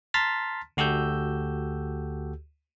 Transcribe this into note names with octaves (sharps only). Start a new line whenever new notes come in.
A5 A#5 C6 F6 A6 B6
D2 F#4 G4 A4 E6 G6